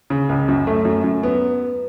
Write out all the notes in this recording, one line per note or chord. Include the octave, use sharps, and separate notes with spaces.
C#3
C#2
F#2
A3
F#2
F#2
B3